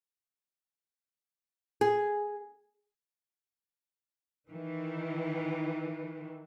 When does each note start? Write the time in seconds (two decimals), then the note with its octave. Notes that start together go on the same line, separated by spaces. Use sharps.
1.81 G#4
4.50 D#3 E3